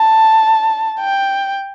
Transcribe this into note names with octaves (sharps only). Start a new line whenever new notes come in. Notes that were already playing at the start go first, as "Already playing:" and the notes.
Already playing: A5
G5